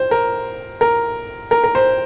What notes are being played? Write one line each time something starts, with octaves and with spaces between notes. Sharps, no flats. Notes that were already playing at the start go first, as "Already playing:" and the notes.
Already playing: C5
A#4
A#4
A#4
A#4
C5